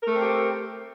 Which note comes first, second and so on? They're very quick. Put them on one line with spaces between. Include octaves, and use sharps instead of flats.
A#4 A3 A4 C4 G4